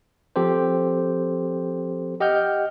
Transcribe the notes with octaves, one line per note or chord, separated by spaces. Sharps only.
F3 C4 G4 A4 C5
G4 D#5 F#5 G5 F6 G6